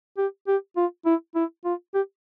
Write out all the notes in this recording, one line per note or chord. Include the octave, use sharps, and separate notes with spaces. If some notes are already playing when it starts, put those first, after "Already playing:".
G4
G4
F4
E4
E4
F4
G4